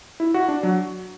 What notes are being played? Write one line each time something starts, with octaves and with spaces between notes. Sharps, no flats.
E4
F#4
D4
F#3